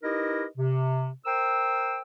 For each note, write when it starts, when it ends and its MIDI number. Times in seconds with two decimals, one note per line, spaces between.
0.03 0.45 63
0.03 0.45 64
0.03 0.45 67
0.03 0.45 70
0.03 0.45 71
0.03 0.45 75
0.57 1.09 48
1.26 2.02 70
1.26 2.02 72
1.26 2.02 79
1.26 2.02 88